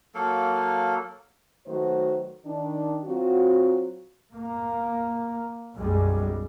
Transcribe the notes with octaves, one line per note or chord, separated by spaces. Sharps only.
F#3 A#3 A4 F5
D#3 F#3 A3 F#4 B4 C5
D#3 D4
F#3 C4 F4 F#4
A#3
B1 F#2 G3 G#3